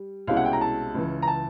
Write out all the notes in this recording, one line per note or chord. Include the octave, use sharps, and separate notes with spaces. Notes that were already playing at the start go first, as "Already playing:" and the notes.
Already playing: G3
C2 B2 G#3 C#4 E4 F5
F#5
G5
A#5
A5
C#2 C#3 E3
A#5
A5